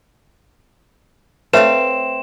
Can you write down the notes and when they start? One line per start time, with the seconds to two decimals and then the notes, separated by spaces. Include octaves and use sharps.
1.53 A3 C4 B4 C#5 E5 F5 E7